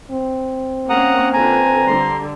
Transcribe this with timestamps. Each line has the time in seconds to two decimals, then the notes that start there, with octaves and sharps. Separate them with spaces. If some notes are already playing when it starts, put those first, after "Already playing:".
0.11 C4
0.90 A#3 C#4 F#5 A#5 D#6
1.33 D3 F4 B4 G#5 A#5
1.87 D3 G3 C6